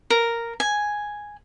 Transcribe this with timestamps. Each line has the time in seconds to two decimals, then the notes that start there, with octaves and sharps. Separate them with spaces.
0.10 A#4
0.60 G#5